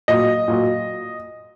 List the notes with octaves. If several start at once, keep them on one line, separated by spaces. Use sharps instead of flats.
A#2 F#3 D#5
A#2 F#3